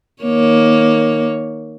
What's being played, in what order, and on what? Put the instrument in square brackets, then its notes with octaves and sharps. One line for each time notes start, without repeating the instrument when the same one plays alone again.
[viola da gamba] D#3 A#3 C#5